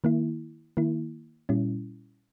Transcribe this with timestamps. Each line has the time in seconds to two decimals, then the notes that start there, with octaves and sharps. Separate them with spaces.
0.04 D#3 A#3 E4
0.77 D#3 A#3 E4
1.49 A#2 G3 C#4 E4